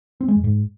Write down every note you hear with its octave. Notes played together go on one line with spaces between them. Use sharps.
C4
G#3
F#2
G#2